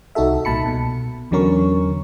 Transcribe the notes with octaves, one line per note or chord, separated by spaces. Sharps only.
C2 D#4 F#4 A4 E5
C2 A#2 A5 B5 C#7
B2
E2 D3 F#3 C#4 A#4 C#6